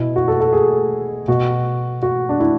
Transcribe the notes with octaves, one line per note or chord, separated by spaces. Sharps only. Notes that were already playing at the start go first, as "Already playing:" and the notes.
Already playing: B2 E4
F#4
A4
A4
G#4
B2 F#4
F#4
D4
E4